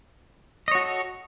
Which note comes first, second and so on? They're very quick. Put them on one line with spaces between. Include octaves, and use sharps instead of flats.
D#5 C#5 F#4 A4